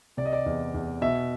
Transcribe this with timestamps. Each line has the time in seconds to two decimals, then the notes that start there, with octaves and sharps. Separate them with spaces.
0.17 C3 D5
0.26 D#5
0.33 D5
0.46 E2
0.74 E2
1.02 B2 E5